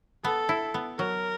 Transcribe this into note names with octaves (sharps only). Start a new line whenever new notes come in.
B3 A4
E4
B3
F#3 A#4